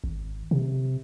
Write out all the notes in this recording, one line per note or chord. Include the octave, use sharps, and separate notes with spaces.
G#1
C3